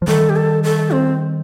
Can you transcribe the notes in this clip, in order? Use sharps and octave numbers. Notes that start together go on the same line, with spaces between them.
F3
D#3 G3 A4
G4
A4
A4
C4